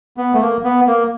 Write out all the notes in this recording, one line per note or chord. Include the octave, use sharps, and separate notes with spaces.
B3
A3
A#3
B3
A#3